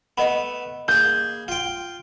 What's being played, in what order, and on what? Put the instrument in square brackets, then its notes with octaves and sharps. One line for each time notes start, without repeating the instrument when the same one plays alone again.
[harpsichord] A3 B3 [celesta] D#5 B5
[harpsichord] A#3 G#4 [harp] G6
[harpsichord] F4 G5